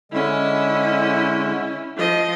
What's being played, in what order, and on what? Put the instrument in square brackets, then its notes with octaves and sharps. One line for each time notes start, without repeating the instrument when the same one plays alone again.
[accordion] D3 G#3 [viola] C#4 E4
[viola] F3 D#5